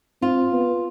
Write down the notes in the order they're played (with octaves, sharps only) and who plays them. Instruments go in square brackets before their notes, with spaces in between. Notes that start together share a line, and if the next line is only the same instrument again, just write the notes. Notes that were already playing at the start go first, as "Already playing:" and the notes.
[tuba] C4 [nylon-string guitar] F4
[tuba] B3